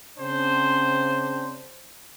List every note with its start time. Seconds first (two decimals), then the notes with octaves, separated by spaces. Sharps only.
0.18 C#3 C4 D4 C5